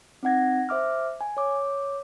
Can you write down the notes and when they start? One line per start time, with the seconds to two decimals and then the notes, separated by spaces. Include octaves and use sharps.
0.23 C4 D#4 F#5 G#6 A#6
0.69 C5 E5 D6 F6
1.21 G#5
1.37 C#5 D6